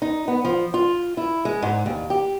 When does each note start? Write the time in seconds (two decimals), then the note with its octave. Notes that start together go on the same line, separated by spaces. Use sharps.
0.02 D#4
0.28 B3
0.45 F3
0.74 F4
1.17 E4
1.45 G#3
1.62 G#2
1.86 D#2
2.10 G4